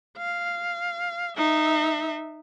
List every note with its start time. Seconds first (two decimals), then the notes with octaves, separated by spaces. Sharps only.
0.17 F5
1.37 D#4 E5